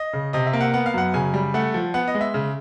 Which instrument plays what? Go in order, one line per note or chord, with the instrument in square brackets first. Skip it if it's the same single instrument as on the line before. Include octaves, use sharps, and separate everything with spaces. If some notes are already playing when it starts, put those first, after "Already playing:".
Already playing: [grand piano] D#5
C#3
C3 D#5
E5
A#3
F#5
B3 F#5
F5
F#2 F#5
C#3 G#5
G3
A3 F#5
F3
B3 F#5
D#5
G#3
E5
C#3